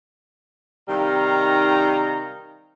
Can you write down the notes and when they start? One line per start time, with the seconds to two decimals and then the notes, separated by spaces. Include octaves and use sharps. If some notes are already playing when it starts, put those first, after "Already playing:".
0.89 C3 D#3 G3 D#4 F5 A#5